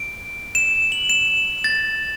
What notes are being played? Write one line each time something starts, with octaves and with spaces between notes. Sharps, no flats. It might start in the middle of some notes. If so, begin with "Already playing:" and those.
Already playing: D7
E7
F#7
E7
A6